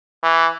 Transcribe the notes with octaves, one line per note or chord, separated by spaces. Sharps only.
E3